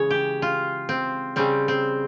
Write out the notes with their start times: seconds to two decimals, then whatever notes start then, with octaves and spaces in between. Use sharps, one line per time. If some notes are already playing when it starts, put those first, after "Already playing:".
Already playing: C#3 E3 G#3 C#5
0.10 G4
0.42 F4
0.89 C4
1.36 C#3 G3 C4
1.68 C4